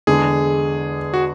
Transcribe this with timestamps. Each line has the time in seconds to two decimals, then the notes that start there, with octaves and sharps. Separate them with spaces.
0.07 E2 D3 G#3 G#4
1.14 F#4